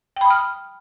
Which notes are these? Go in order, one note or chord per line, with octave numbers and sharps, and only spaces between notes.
G5 B5 D#6 F6